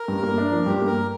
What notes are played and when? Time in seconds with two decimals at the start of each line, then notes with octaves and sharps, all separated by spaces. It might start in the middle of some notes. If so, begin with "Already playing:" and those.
Already playing: A#4
0.08 G2
0.23 A#3
0.38 D4
0.52 F3
0.66 G2 G4
0.81 A#3
0.87 A#4